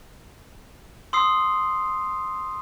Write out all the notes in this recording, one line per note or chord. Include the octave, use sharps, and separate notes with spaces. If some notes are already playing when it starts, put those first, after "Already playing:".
C6 D#6 E6 C7